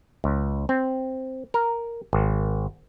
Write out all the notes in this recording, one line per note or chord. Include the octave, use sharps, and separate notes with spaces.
C#2
C4
A#4
G#1